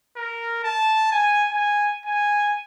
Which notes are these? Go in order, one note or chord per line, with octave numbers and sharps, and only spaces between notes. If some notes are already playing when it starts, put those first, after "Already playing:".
A#4
A5
G#5
G#5
G#5